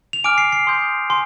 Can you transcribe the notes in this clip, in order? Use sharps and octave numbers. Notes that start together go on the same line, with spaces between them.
F7
G#5 D6 F6 D7
C7
C7
C6 D#6 G6
G#5 C6